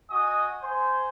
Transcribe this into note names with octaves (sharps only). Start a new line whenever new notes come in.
F#4 D#5 G#5 D#6
C5 G#5